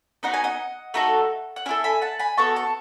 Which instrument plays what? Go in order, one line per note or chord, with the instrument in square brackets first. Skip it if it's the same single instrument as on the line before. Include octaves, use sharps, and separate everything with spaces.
[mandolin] B3 D#4 F#4 F#5
G#5
D#5 F#5
A3 D#4 F#4 A4
F#5
C#4 E4 A4 E5 G#5
G#5 B5
F#5 A5
G#5 B5
B3 F#4 A4 A5 C#6
A5 C#6